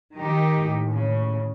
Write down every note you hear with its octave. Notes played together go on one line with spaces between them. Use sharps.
D#3 D#4 G4
D#2 A2
C#3